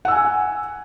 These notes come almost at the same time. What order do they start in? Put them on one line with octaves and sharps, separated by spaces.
F#5 E6 G#5